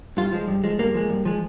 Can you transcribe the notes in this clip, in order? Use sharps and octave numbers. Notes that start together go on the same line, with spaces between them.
G2 F4
F3 G#3
G2
F3 G#3
G2 A#3
F3 G#3
G2
F3 G#3